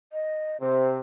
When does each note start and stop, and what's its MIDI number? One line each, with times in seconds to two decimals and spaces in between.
0.13 0.60 75
0.61 1.01 48
0.61 0.90 72